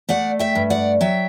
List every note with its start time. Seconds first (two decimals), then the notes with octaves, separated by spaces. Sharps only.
0.09 A3 D5 F#5
0.39 E5 G5
0.55 G2
0.70 D5 F#5
1.01 F#3 E5 G5